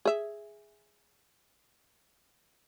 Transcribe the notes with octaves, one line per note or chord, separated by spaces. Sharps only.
G#4 E5